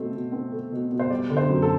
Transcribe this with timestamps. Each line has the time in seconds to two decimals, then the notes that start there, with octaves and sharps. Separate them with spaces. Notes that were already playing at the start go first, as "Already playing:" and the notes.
Already playing: B2 A3 C4
0.13 B2
0.32 C4
0.52 A3
0.72 B2
0.92 B2
1.00 C5
1.10 G3 D5
1.30 D3
1.37 C5
1.49 F#2
1.62 A4